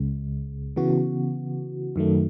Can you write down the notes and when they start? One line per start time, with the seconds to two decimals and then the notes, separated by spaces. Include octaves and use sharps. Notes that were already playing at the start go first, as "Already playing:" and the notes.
Already playing: C#2 C#3 G#3
0.76 C#3 E3 B3 F#4
1.96 F#2 D#3 F#3 A3